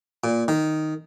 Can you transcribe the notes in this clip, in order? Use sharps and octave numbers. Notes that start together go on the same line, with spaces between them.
A#2
D#3